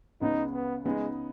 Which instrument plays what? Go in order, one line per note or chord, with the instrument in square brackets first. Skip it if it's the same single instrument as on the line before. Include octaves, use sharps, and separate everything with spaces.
[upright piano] C#2 C#3 B3 [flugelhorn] D#4
[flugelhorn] B3
[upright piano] C#3 B3 D#4 [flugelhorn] G#3